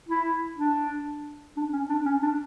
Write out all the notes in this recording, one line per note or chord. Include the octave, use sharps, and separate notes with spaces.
E4
D4
D4
C#4
D4
C#4
D4